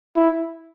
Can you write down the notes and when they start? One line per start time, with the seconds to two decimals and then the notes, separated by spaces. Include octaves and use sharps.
0.16 E4